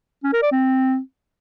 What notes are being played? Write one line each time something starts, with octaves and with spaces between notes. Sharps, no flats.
C#4
A#4
D5
C4